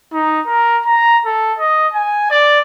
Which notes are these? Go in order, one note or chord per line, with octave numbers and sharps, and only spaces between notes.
D#4
A#4
A#5
A4
D#5
G#5
D5